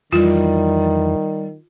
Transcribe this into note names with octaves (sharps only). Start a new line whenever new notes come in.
F2 D#3 E3 G3 F4